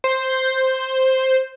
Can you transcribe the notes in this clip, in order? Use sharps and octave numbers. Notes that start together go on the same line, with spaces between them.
C5